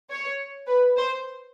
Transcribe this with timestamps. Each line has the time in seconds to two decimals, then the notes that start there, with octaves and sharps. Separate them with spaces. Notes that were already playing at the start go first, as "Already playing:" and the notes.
0.10 C#5
0.67 B4
0.97 C5